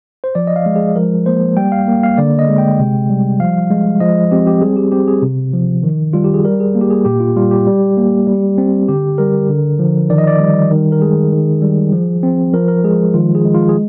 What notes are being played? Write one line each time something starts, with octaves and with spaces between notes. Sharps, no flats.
C5
F3 D5
D#5
F5
G#3
G#4
F3 A#4
A#3 C5
G3 G5
F5
A#3
F5
D3 D5
D#5
G#3
G5
C3
G3
F3 F5
G#3
F3 D#5
C4 G4
G4
G3 G#4
G4
C4 G4
G#4
C3
F3
D#3
G3 F4
G4
G#4
G3 A#4
G#4
A#3
G4
G#4
A#2 G4
F4
G3 F4
G4
G3
A#3
G3
C4
D3 G4
G3 A#4
D3
F3
D#3 D5
D#5
D5
G3
D#3
A#4
G#3 G#4
D#3
G3
F3
C4
F3 A#4
A#4
G#3 G#4
D#3 F4
G#4
G#3
F4
G#4